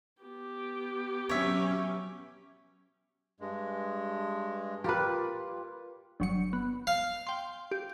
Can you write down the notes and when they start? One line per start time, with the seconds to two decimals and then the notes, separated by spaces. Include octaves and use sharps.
0.22 B3 G4
1.29 F#3 C#4 C#5 E5
3.40 G2 G#3
4.84 G3 A#3 F4 G4 B4
6.20 G1 F#3 C#7
6.53 B3
6.87 F5
7.27 G5 C6
7.71 G4